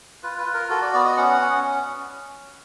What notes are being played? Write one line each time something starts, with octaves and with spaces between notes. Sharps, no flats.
F4 B4
B4
F4
A#4
F#4 A4
D5
B3 D5
D#5
C#4 F#5
C#4